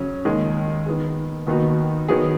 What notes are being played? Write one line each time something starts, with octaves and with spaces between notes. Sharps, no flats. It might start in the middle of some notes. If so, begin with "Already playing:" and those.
Already playing: C#3 F#3 C#4
D#2 D#3 G#3
D#3 B3 G#4
D#2 D#3 B3 D#4 F#4
D#3 F#3 B3 G#4